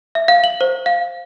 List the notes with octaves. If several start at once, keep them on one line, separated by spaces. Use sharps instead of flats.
E5
F5
F#7
C5
F5